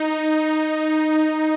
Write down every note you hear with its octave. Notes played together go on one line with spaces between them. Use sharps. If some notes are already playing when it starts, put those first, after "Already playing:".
Already playing: D#4